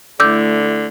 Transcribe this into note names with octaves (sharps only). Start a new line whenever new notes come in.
D3 A3 E4 D6 E6 G6